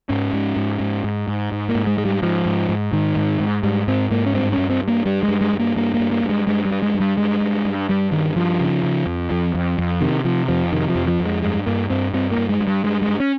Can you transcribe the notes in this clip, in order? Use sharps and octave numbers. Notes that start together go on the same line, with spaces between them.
G#2 C#4
G#2
G#2
G#2
G#2
G#2
G#2
A#3
G#2
G#3
G#2 G#3
G3
G#2 F3
G#2
G#2
G#2 D#3
G#2
G#2
G#2 G3
G#2 C4
G#2 A#3
C#4
G2 C4
C#4
G2
C4
G2
A#3
G2 G3
G#3
G2
G#3
G2
A#3
G2 A#3
A#3
G2
A#3
G2
G#3
G2 G#3
G3
G2
G#3
G2
G3
G2 G#3
G2
G2
G2 G3
G2 D#3
G2 F3
C#3
C#3
F2
F2
F2
F2
C3 D#3
C3 F3
F2 F3
C3 D#3
F3
F2
F3
F2
G#3
G2 G#3
G2 A#3
G2 C4
G2 C4
A#3
G2
G#3
G2
G3
G2 G#3
G#3
G2
C#4